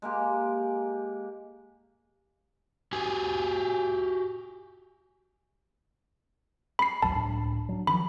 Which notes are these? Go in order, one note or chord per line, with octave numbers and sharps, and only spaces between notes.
G#3 A#3 G4
F#4 G4 G#5
B5 C7
A1 D#2 F#3 A5
C#2 A2 D4
F#3 D4
D#3 F3 F#3 B5